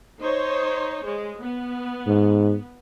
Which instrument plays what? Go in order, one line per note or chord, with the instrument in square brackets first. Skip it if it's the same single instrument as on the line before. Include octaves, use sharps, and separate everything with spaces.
[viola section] D#4 C5 C#5
G#3
B3
[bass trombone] G#2